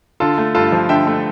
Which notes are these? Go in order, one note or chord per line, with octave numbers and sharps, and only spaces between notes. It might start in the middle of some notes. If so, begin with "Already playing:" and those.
D3 F4 A4
A3
G2 F4 A4
F3
D3 E5 G5
A3